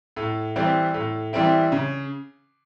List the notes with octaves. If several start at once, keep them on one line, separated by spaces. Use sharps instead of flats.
A2
E3 G3 C4 E4
A2
E3 G3 C4 E4
C#3